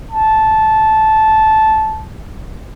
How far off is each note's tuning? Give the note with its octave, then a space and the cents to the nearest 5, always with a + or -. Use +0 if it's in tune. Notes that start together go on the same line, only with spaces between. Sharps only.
A5 -10